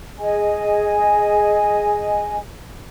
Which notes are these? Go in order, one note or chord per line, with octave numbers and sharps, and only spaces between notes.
G#4 D#5 G#5